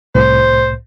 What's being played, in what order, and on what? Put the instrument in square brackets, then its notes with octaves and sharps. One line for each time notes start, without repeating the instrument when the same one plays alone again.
[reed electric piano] C2 A2 [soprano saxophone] C5